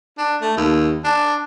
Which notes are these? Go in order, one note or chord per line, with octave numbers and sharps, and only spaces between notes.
D4
A3
D#2
D4